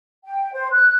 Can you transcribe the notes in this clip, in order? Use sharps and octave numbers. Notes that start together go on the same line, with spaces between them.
G5
C5
F#6